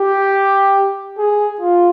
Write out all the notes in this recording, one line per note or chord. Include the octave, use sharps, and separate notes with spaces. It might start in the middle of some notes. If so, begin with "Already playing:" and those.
Already playing: G4
G#4
F4